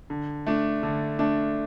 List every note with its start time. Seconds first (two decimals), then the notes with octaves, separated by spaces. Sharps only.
0.10 D3
0.46 A3 D4
0.83 D3
1.19 A3 D4